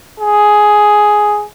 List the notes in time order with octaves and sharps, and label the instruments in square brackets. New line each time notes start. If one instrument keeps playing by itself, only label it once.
[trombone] G#4